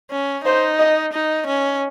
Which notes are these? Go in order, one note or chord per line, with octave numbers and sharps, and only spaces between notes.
C#4
D#4 C5
D#5
D#4
C#4